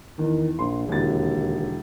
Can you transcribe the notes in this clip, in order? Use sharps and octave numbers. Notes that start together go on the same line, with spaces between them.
E2 D#3
A#1 C6
E1 D#2 D3 A6